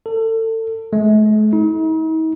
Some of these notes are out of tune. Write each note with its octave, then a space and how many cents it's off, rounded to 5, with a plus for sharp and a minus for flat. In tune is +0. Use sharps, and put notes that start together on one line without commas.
A4 +30
A3 -45
D#4 +45